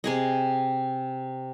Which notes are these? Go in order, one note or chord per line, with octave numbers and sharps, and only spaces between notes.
C3 G#4 D#5